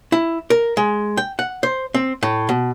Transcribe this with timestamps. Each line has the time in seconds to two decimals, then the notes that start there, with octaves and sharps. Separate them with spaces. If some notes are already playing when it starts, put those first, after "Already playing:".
0.12 E4
0.50 A#4
0.77 G#3
1.17 G5
1.39 F#5
1.63 C5
1.94 C4
2.23 A2
2.49 B2